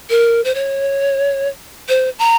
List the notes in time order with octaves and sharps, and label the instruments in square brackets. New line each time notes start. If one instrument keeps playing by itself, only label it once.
[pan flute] A#4
C5
C#5
C5
A#5